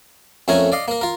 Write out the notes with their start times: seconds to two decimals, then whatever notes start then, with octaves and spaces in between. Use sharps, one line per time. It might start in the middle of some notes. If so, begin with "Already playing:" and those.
0.48 F2 A3 C#4 A#4 G#5
0.72 D5 D#5 F5
0.88 A#3 A#4
1.01 F4 A#4